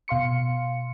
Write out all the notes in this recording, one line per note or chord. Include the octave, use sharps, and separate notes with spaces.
B2 F5 C6 C#7